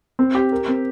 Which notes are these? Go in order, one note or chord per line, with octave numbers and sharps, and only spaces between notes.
C4
G4
A#4
C4